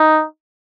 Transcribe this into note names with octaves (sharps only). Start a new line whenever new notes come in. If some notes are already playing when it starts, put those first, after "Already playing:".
Already playing: D#4